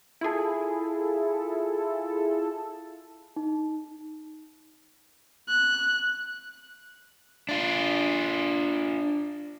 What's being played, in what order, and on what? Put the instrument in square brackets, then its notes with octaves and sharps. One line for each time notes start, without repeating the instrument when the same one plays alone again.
[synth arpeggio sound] E4 F4 G#4 A4
[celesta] D#4
[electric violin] F#6
[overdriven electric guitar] D4 F4